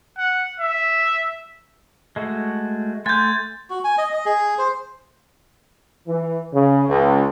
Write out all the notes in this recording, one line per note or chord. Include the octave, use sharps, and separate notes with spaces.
F#5
E5
G#3 A3 F#4
A3 F#5 G#5 C6 G6 A6
F#4
G#5
D#5
D#5
G#4
C5
E3
C#3
C#2